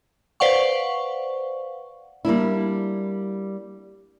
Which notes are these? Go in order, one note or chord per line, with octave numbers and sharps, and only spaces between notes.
B4 C5 D5 F5 F#5 C#6
G3 A#3 D4 E4